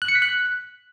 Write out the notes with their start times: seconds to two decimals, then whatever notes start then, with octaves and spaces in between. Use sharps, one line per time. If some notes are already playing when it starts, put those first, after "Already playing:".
0.02 F#6
0.08 C#7
0.15 B6
0.22 F#6